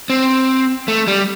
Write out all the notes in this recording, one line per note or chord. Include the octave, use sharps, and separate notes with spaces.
C4
A3
G3